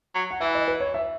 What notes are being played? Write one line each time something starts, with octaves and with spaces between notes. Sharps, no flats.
F#3
F#5
E3 E5
D#5
B4
C#5
E5